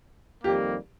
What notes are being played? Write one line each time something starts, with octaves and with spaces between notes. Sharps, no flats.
F2 D#3 G3 A#3 G4